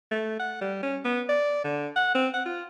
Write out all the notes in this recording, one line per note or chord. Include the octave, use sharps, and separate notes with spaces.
A3
F#5
G3
C#4
B3
D5
D3
F#5
C4
F#5
F4